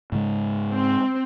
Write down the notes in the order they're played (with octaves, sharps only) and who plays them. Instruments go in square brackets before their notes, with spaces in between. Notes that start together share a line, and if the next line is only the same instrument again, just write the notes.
[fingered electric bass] G#2 C#3 G#3
[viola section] C4